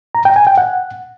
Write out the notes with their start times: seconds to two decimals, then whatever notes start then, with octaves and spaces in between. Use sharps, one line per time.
0.15 A#5
0.25 G5
0.36 G#5
0.47 G5
0.58 F#5